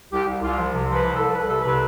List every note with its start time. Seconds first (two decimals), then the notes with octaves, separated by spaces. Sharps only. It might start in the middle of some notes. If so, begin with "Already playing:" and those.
0.12 C2 G4
0.26 C2
0.42 C2 F4
0.58 F3
0.73 C3
0.89 F3 B4
1.04 C2
1.15 A4
1.20 C2
1.34 C2 B4
1.48 C3 A4
1.61 C3 B4